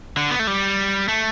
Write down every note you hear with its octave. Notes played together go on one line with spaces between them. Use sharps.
D3
B3
A3
G3
A3